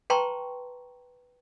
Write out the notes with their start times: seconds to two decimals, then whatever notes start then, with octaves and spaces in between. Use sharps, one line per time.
0.10 B4 G5 A5 A#5 C6 C#6